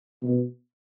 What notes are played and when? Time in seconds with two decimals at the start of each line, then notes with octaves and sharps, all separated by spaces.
0.23 B2